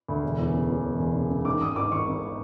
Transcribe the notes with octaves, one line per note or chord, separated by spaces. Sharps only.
D2
E1
E2
C#3
E2
E1
E1
C#3
C#3
D#3 D6
G#1 D#6
G#2 D6
G#1 C#6
G#1